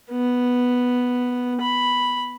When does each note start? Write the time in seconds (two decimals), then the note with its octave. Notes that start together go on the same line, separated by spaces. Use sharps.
0.11 B3
1.62 B5